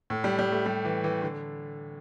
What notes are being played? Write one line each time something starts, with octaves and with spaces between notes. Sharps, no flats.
A2
G3
G3
A3
G3
E3
E3
D3